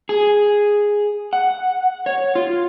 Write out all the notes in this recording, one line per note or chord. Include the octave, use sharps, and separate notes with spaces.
G#4
F#5
C#5
F4